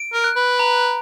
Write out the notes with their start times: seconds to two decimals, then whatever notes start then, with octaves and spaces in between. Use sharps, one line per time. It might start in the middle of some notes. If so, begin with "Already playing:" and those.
Already playing: D7
0.13 A#4
0.24 F#6
0.36 B4
0.59 A#5